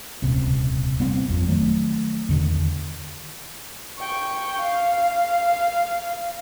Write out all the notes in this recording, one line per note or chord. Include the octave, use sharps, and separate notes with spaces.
D#1 C#2 C3
G3 B3 C4
G#1 F2
D#3 F#3 A3
E2 D3 D#3
G5 C#6
F5